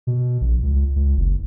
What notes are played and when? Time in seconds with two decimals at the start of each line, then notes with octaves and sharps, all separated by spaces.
0.07 B2
0.41 A#1
0.63 C#2
0.96 C#2
1.17 F#1